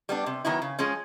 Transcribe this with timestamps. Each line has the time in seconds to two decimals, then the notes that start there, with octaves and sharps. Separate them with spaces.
0.09 G3 B3 D4
0.26 C3
0.45 D#3 F#3 B3 E4
0.62 C#3
0.79 F3 G#3 C#4